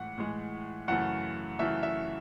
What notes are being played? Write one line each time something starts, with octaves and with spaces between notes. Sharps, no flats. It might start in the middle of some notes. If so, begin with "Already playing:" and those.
Already playing: A2 E3 G#3 F#5
A2 E3 G#3
F#2 C#3 E3 A3 F#5
F#2 C#3 E3 A3 E5
E5